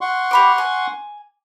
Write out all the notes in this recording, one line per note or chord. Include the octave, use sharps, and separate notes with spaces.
F#5 C6 C#6
G4 B5 D6
G#5